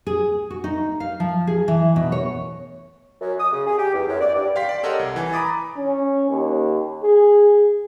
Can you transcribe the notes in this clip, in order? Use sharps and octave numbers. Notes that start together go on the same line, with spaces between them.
G#4
F#4
D#4
F5
F3
G#4
E3
B2
C#5
F#2
D#6
C#3
G#4
G4
E2
F#2
D5
G2
F5 G5 C6 B6
D5 C6
G4 A4 A#4 C#5 D#5 F#5
C2
E3 G#5
A#5 B5 D6 D#6 A6
C#4
D#2
G#4